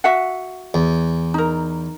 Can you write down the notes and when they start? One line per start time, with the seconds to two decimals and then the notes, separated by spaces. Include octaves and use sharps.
0.04 F#4 E5 F#5
0.74 E2
1.34 D#4 A#4